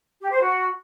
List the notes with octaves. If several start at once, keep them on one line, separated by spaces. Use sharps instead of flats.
G4
C5
F#4